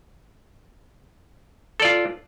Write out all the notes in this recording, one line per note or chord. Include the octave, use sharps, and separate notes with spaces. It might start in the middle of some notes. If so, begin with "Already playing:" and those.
F4 A4 D5